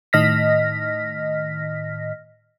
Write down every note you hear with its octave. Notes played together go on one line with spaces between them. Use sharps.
A2 D#3 D#5 F6 A#6 B6